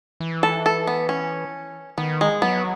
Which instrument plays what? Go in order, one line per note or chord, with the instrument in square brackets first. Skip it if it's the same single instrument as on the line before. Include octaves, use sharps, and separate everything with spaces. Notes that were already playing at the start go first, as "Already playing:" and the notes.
[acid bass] E3
[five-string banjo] A4
A4
B3
C#4
[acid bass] D#3 [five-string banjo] B3
[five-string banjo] G#3
[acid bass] F#3 [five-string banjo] B3